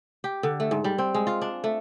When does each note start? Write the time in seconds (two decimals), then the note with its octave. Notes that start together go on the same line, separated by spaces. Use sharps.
0.24 G4
0.43 D3
0.60 A3
0.71 G#2
0.84 G3
0.98 C4
1.15 G#3
1.27 F4
1.42 D4
1.64 A3